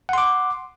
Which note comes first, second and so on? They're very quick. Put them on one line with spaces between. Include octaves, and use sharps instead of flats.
F#5 C6 D6